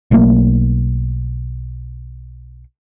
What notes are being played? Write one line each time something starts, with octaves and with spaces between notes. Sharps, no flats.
B1 F#3 A3 A#3